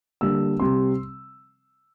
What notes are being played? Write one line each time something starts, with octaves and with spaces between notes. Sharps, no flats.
D3 G3 A#3 E6
C3 G3 C4 C6